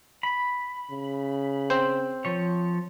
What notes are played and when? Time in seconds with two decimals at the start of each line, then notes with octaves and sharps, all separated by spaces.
0.23 B5
0.90 C#3
1.70 C4 C5
2.25 F3 C#5